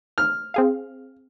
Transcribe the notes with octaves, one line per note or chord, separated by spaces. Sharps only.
F6
C4 G#4 F5